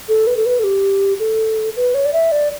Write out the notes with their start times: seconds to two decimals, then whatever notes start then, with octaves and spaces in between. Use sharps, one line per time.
0.08 A4
0.27 B4
0.37 A4
0.46 B4
0.59 A4
0.64 G4
1.19 A4
1.76 B4
1.94 C#5
2.05 D5
2.13 E5
2.32 D5